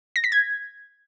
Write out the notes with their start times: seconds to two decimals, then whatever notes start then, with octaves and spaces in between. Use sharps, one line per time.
0.16 A#6
0.24 B6
0.32 G#6